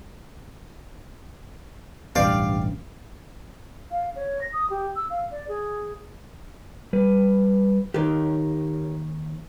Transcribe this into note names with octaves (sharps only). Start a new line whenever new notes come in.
E1 A1 G2 G4 D5 F5
F5
C#5
A#6
D#6
G4
E6
F5
D5
G#4
G3 B4
D#2 D#3 G4 A#4 C#5